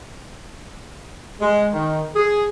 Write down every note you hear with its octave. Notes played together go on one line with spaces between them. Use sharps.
G#3
D#3
G#4